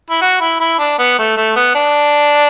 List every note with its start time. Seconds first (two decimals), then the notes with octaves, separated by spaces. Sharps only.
0.11 E4
0.22 F#4
0.41 E4
0.60 E4
0.79 D4
0.99 B3
1.19 A3
1.37 A3
1.56 B3
1.75 D4